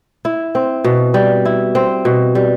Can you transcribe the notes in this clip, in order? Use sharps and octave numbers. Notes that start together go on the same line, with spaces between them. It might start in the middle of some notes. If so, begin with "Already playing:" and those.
E4
C4
B2
G3
E4
C4
B2
G3